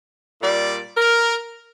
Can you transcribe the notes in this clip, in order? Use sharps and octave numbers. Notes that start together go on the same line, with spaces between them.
A#2 G3 D5
A#4